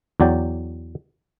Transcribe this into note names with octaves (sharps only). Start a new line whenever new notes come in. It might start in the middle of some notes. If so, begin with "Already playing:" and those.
E2 F#3 D5 G5